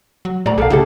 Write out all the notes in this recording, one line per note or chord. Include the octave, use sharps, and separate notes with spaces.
F#3
A2 D5 A#5
B1 A4 A#4 F5
C#3 E4 G4 A4